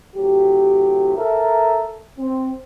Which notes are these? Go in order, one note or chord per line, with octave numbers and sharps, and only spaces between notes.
A2 C3 F#3 G4
A4 A#4 E5
C4